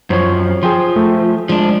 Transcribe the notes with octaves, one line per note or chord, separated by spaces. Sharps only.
F#2 F3 C5 C#5
F3 G#4 G5 C6
A3
F3 G#3 D4